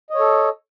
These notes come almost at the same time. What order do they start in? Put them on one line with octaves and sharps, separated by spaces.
D#5 C#5 A4